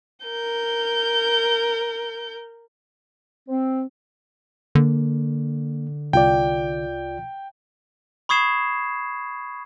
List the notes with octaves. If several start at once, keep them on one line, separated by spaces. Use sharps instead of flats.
A#4 G6
C4
D3 A#3
C2 F4 D5 G5
B5 C#6 D#6 G#6 C7 E7